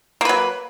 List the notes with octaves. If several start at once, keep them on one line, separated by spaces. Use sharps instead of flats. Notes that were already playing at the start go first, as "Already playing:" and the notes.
F#3 A#3 B4